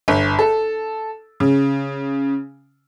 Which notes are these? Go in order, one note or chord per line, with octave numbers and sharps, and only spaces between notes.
G1
A4
C#3